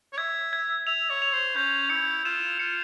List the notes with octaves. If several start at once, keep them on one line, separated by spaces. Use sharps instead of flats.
C#5
E5 G#6
G#6
E5 F7
C#5
F7
C5
C#4 G6
E4 C#7
F4 E7
F4 C#7